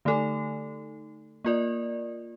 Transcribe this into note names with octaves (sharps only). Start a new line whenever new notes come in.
D3 A3 D#4 A4
A#3 F4 A#4 D5